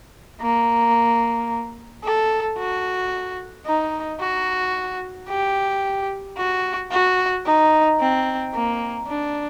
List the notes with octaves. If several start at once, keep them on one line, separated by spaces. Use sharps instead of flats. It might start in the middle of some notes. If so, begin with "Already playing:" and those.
A#3
A4
F#4
D#4
F#4
G4
F#4
F#4
D#4
C4
A#3
D4